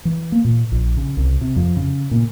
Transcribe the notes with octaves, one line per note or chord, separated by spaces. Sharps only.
E3
A#3
A#2
A#1
C#3
C2
C3
F2
C#3
A#2